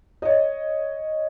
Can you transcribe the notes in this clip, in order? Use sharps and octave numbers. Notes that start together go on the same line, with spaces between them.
C#5 D#5